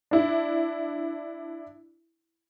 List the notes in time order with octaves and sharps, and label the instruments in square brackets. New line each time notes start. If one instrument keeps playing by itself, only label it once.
[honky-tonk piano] D4 E4